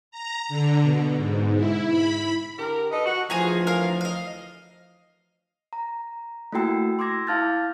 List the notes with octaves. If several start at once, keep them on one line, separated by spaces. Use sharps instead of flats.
A#5
D3
B2
G#2
E4
B5
D3 G4 A#4
A4 B4 D#5
F#4
D2 E3 F3 G#4 G#5 A#5
A#4 F5
D#5 F5
A#5
A3 A#3 E4 F#4 G5 E6
C6 D6 E6 G#6 A#6
E4 F5 A5 F6 G6 A6